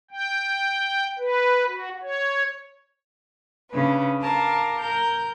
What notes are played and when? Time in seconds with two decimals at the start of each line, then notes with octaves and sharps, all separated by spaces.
0.11 G5
1.19 B4
1.68 F#4
2.03 C#5
3.71 C#3 C#4 D4 B4
4.21 A#4 F5 A5 D6
4.79 A#4 G6